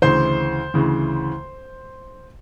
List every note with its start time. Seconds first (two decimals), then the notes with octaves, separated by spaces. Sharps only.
0.02 D2 C#3 E3 C5 C6
0.74 D2 C#3 E3